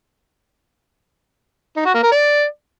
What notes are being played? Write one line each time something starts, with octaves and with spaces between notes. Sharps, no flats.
D#4
F#4
A#3
A#4
D5